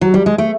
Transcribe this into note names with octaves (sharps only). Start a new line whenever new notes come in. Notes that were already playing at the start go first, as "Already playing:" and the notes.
F#3
G3
G#3
A3